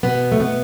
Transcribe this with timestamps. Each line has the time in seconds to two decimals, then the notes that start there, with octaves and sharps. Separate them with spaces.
0.03 B2 B3
0.32 A3
0.40 B2 B3